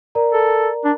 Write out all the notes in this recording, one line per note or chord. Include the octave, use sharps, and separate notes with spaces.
A#4 D5 A#5
A4
D4